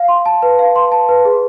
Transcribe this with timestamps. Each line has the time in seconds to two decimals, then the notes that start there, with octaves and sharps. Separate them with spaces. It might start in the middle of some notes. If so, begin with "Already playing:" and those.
Already playing: F5
0.08 C6
0.26 A5
0.42 B4
0.59 F5
0.76 C6
0.92 A5
1.09 B4
1.25 G#4